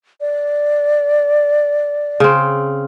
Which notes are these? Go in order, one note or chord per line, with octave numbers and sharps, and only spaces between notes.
D5
C#3 C4